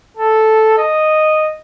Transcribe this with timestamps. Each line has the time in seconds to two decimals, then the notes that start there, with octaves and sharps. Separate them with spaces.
0.17 A4
0.78 D#5